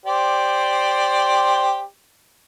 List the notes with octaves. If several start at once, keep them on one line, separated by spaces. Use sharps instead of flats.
G4 C5 D5